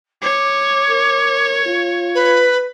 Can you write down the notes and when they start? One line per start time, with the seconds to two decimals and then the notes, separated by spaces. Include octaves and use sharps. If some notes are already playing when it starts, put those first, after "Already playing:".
0.22 C#5 D6
0.89 A#4
1.66 F4
2.15 B4 B5